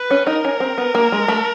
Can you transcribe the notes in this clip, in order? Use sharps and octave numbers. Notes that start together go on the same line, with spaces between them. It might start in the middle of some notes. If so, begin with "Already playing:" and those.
Already playing: B4
C#4
D#4 A#4
C#4
C4
B3
A#3
G#3
A3